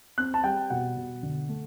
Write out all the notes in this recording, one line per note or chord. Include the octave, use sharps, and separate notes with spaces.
C4 F#6
A5
G3 G5
B2 F#5
B2
D3
A3